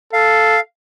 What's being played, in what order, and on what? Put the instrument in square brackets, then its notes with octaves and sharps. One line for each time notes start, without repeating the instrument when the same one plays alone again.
[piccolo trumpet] A4 [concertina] F5